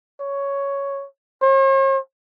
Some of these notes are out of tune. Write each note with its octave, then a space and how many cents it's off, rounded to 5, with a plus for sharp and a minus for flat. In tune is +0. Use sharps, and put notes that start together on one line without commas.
C#5 +5
C#5 -45